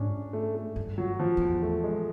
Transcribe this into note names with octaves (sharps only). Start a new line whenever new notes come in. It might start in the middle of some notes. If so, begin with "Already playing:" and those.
Already playing: G#2 C#4 D4
A3
A3
G2
F#3
F3
F2
E2
A3
G#3